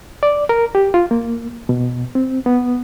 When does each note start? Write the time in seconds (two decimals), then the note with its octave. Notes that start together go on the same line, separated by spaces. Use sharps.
0.23 D5
0.49 A#4
0.75 G4
0.94 F4
1.11 A#3
1.69 B2
2.15 C4
2.46 B3